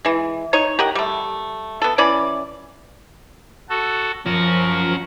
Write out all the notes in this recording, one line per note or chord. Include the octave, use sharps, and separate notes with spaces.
E3 G#3
D#4 C#5
G4 A#4 D#5 F#5
G3 A3
B3 A4
E3 C#4 D5 B5
F#4 A4
F3 C#4 F#4 A#4